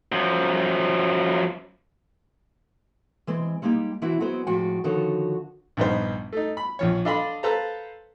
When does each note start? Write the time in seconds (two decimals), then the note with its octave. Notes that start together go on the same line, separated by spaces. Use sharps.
0.12 F#2 F3
3.27 E3 G#3 C4
3.62 G3 G#3 A#3 D#4 G4
4.02 E3 C4 E4 F#4
4.20 F#3 G#3 B3 C4 C5
4.47 A2 F3 G#3 F#4 D5 G5
4.84 D3 D#3 F3 D#4 F#4 C#5
5.77 A#1 G2 B3 D#4 C5
6.32 A3 D#4
6.57 B5
6.79 A#1 F3 C#5
7.05 D4 A4 D#5 F5 B5 C6
7.43 A4 B4 C5 F5 A5 A#5